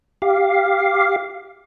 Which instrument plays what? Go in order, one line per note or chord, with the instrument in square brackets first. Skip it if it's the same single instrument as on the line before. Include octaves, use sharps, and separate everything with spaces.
[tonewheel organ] G4 F5